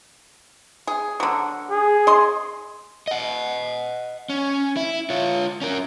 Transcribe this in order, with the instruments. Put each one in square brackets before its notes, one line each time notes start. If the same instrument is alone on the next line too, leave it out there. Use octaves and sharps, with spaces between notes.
[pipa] G#4
D3 F#3
[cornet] G#4
[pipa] D#5 C6
[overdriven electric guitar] D#5 F#5
C#4
E4
F4 C#5
C#4 A#4